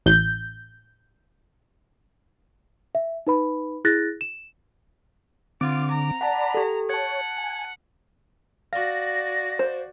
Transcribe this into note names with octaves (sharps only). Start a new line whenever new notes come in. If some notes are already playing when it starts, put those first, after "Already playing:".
A1 G6
E5
D#4 B4 B5
E4 G#4 F#6 A6 A#6
E7
D3 C4 F4 D6
A#5
D5 F#5 A5 B5
G4 A4
C#5 F#5 A5 G#6
G#5
F#4 D5 F5 A#6
C5